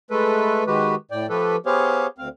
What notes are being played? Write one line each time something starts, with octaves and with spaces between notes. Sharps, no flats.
G#3 A3 A4 B4
D#3 G#3 F#4 G4 B4
A2 D5 G5
F3 A3 G4 A4 B4
B3 G4 G#4 C5 C#5 F5
D2 C4 F5